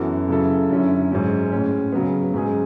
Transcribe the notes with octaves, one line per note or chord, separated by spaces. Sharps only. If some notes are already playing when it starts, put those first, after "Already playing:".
Already playing: F#2 E3 B3 F#4 A4
C#3 F#3 C#4 E4 A4
F#2 D3 F#3 C#4 E4
G#2 F#3 C#4
A2 G#3 C#4
C#3 F#3 B3
G#2 F#3 C#4 G#4